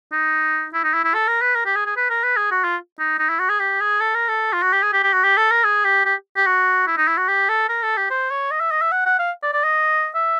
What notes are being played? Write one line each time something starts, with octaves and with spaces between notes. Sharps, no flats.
D#4
E4
D#4
E4
E4
A4
A#4
B4
A#4
G4
G#4
G#4
B4
A#4
B4
G#4
F#4
F4
D#4
D#4
E4
F#4
G#4
G4
G#4
A4
A#4
A4
F4
F#4
G4
G#4
G4
G4
F#4
G4
A4
A#4
G#4
G4
G4
G4
F#4
E4
D#4
E4
F#4
G4
A4
A#4
A4
G4
C5
C#5
D#5
E5
D#5
E5
F#5
F#5
F5
D5
D5
D#5
E5